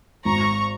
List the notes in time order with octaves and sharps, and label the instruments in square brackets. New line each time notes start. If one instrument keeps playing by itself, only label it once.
[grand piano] G#1 [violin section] A#5 C#6